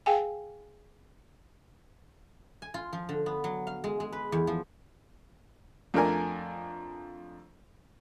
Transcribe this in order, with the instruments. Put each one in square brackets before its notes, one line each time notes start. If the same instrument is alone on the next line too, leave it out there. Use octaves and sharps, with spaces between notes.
[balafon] G#4 F5 G5 G#5
[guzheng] G#5
F4
F3
D3
B3
F#3
F5
G#3
G#3
B4
E2
F3
[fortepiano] F2 A3 D4 A#4 D5 G#5